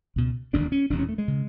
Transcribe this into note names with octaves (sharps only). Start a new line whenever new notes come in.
C#2 B2
E1 D#2 D3 D4
C#4
E1 E2 C3 D4
C#4
A3
G#3
C#3